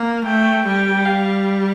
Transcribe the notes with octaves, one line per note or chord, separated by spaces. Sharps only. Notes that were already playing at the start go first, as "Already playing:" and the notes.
Already playing: A#3
A3 G5
G3 G5
F5